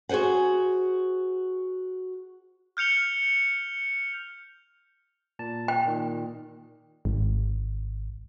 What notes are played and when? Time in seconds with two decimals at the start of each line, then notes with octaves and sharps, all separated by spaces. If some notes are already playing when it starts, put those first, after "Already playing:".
0.09 F#4 G#4 B4 C5 F#5
2.77 F6 G6 C#7 F7 G7
5.39 A#2 A5
5.68 G5
5.86 A#2 D#3
7.05 G#1